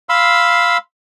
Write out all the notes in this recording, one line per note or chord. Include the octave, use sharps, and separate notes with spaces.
F5 B5 C6 E6